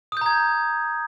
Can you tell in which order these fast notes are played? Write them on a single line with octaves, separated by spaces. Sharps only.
D#6 G6 A#5 G#6